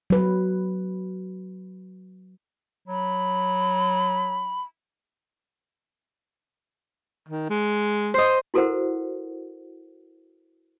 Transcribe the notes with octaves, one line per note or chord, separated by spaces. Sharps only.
F#3 B4
F#3 B5
D#3
G#3
C5 D#5
E4 F#4 A4 A#4 C5 F#5